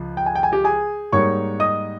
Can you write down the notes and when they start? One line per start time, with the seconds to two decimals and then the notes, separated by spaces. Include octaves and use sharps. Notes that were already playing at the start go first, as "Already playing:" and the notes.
Already playing: C#2 F3
0.17 G5
0.26 G#5
0.35 G5
0.43 G#5
0.52 G4 G5
0.64 G#4 G#5
1.12 G#2 G3 A#3 D#4 C#5 C#6
1.60 D#5 D#6